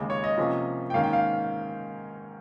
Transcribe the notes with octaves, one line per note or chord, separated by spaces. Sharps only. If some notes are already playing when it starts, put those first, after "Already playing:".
Already playing: D#2 C#3 G#3
C#5
D#5
C3 F3 A#3 C#4
G5
G#2 D#3 A#3 C#4 F5
G5
F5